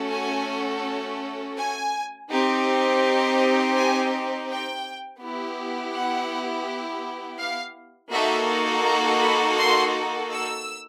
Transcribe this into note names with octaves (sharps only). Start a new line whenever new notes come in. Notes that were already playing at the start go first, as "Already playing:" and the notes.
Already playing: A3 C#4 F#4 A4
G#5
G#5
C4 D#4 G4
G#5
G5
B3 E4 G4
F#5
F5
A#3 D#4 F#4 A4 E5
A#5
B5
C6
E6